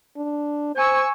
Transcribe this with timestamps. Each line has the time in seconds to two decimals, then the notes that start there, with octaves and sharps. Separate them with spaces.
0.17 D4
0.75 C5 G#5 C#6 E6